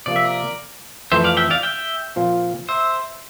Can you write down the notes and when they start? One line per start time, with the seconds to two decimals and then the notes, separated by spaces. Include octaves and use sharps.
0.06 C3 F3 A#3 D5
0.16 E5
0.24 A#4 D5
1.12 F2 E3 A3 C4 C5 E5
1.24 D5 F5
1.37 E5 G5
1.50 D5 F5
1.63 E5 G5
2.16 A#2 F3 C4 F4
2.68 C5 E5